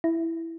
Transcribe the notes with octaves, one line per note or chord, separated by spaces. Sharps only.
E4